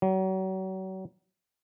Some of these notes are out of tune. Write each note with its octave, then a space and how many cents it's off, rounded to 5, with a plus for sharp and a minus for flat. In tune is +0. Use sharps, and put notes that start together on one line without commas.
F#3 +35